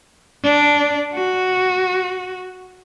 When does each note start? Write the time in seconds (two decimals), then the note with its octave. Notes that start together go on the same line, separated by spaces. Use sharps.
0.44 D4
1.14 F#4